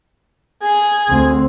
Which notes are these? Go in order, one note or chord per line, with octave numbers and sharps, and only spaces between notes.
G#4
D2 C4